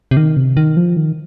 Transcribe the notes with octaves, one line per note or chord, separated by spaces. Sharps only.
C3
D#3
C3
D#3
F3
D#3